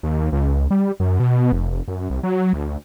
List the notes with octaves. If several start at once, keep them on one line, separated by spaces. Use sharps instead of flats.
D#2
C#2
G3
F#2
B2
F1
F1
F#2
C2
F#3
D2